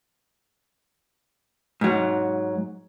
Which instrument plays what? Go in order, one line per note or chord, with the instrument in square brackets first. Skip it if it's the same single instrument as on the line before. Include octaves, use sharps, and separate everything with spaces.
[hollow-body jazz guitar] G#2 F#3